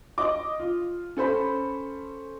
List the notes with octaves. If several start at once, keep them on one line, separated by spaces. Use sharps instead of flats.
D#5 D6
F4
C#4 A4 C5 B5